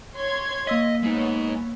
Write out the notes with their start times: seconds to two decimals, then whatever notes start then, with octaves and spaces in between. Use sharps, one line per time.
0.15 C#5 C6 G#6
0.67 A#3 D#5 E6 B6
1.03 G#3 B3 D#4 C#5